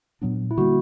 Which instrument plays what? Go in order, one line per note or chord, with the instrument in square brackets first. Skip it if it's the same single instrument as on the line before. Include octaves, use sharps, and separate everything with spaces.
[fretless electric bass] A#2 F#3 B3 D4
[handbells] E4
[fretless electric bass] D3 G3 A#3 [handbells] F#4